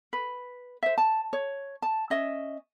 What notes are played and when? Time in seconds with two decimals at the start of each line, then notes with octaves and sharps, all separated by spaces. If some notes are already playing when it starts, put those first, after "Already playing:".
0.13 B4
0.83 C5 E5
0.98 A5
1.33 C#5
1.82 A5
2.10 C#4 D#5 E5